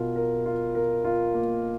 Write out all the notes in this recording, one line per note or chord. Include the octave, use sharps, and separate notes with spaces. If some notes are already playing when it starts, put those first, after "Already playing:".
Already playing: B2 F4 A#4
A#4
F4
A#4
F4
A#3